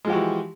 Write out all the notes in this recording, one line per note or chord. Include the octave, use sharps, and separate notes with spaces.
E3 F3 G#3 F#4 G4